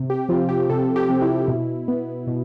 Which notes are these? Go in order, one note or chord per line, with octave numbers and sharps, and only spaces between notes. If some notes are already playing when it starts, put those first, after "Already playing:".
Already playing: C3
G4
F3 C4 F4
G4
C3 A4
G4
F3 C4
E4
B2
B3
B2